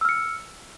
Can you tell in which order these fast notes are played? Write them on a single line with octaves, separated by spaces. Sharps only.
E6 F6 C#7